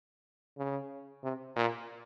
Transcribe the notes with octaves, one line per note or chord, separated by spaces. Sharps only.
C#3
C3
A#2